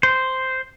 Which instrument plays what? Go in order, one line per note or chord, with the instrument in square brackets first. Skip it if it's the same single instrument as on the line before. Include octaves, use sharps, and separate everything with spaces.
[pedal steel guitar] C5